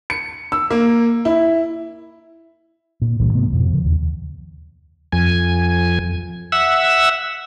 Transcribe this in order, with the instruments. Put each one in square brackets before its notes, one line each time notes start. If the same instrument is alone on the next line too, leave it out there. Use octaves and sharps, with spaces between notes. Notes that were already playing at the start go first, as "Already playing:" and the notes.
[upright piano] C#7
E6
A#3
E4
[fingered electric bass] A#2
C#2 G2 A#2 E3
G#2 C3 A3 B3
F2 B2
C#3 F3
D#2
[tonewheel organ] F2 G#5
E5 F#5 E6